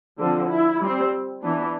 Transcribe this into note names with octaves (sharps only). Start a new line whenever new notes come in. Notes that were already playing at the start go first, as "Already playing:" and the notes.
D3 F3 C4 A4
E4
G3
C4
E3 B3 D4